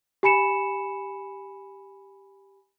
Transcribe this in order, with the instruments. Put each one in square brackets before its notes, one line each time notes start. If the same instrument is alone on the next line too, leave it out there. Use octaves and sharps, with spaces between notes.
[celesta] G4 G#5 B5 C#7 E7